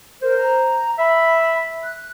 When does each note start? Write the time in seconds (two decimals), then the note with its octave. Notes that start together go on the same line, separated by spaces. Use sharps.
0.22 A#4 C5
0.37 A#5
0.98 E5 B5
1.83 F#6